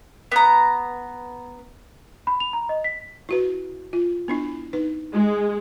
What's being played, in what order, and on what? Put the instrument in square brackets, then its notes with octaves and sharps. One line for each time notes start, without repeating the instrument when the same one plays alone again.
[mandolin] B3 A#5
[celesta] B5
F7
A#5
D#5
B6
[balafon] E4 F#4 B4
F4
B3 D4 E4
D#4 B4
[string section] G#3